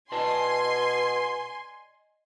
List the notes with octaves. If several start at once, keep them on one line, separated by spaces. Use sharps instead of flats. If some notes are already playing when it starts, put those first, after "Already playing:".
B2 D5 D#5 G#5 A5 C6